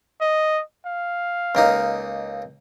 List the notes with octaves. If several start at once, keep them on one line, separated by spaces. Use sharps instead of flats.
D#5
F5
C#2 A#3 D#4